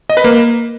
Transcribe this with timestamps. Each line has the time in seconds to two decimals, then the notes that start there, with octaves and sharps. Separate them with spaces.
0.10 D#5
0.17 B4
0.24 A#3